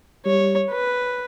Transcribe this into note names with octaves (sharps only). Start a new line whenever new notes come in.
G3 C#5
B4